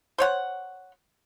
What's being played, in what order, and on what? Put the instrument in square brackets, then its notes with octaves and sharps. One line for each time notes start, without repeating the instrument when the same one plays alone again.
[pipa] C5 C#5 F#5